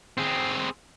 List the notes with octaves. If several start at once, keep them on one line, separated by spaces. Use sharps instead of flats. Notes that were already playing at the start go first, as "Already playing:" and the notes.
C4 G#4